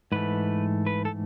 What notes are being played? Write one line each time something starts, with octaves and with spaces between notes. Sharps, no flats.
G#2 E3 A3 B4
B4
A4